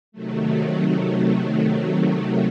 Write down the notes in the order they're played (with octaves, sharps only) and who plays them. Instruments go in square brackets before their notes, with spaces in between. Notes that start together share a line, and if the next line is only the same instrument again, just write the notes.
[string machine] C3 D#3 F#3 A3